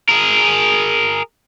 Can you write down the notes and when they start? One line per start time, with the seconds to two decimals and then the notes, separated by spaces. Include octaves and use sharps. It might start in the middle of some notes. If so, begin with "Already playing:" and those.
0.09 G#4 A#4